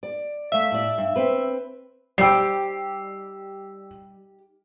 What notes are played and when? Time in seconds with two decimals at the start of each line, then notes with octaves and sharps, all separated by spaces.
0.03 D5
0.52 A3 E5 F5
0.71 A2 D5
0.98 G2
1.16 C4 B4
2.18 G3 D#4 G4 C5 G5 E6 C7